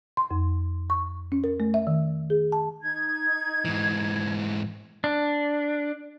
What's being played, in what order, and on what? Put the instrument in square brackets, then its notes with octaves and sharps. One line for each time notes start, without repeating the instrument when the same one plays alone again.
[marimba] C6
F2
C#6
C#4
A#4
A3
E5
D#3
G#4
A5
[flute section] D#4 G#6
[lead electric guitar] G#2 E3
[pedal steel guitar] D4